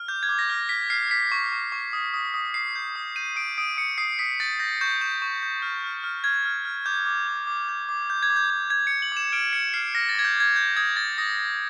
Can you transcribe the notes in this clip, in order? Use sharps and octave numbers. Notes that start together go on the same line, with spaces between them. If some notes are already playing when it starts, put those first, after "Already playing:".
Already playing: F6
D6 G6
G#6
D6
A#6
F6
A#6
F6 B6
F6 C7
F6 B6
C#6
C#6
C#6
D#6
D#6
D#6
D#6 C7
G6
D#6
G6 D#7
D#6 D7
D#6 D7
D#6 C#7
D#6 C7
D#6 B6
G6 A6
G6 A#6
C#6 G6
C#6 G6
C#6
G6
F6
F6
F6
F6 G#6
F6
F6
D6 G6
D6
D6
D6
G6
D6
D6 G6
G#6
D6
G6
D6
G6 G#6
G6 C#7
F#7
D6 E7
F6 D7
F6 C#7
F6 C7
F6 A#6
A6
D6 G#6
G6
D6 G#6
G6
D#6 G#6
D#6 A6
D#6 A#6
D#6